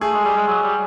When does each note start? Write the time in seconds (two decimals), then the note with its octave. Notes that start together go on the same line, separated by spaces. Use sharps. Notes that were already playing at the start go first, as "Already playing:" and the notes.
0.01 A3 G#4
0.14 G#3
0.25 G3
0.37 G#3
0.48 F#3
0.63 G3